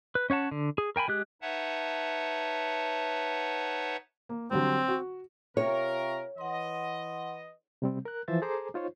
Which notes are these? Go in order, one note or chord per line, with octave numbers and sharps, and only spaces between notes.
B4
C#4 C#5 F#5 A5
D3
G#4
A#4 G5 G#5 B5
G#3 G4 F#6
D#4 B4 C#5 E5 F#5 A5
A#3
D3 F#3 G3 C4
F#4
C3 F4 A#4 C#5 E5 G5 C#6
E3 B4 D#5 F#5 C6
C3 G3 C4
A#4 F#6
E3 F3 C5 E5 A6
G#4 A4 C5 G#5 A#5 D6
D#4 F4 C5 C#5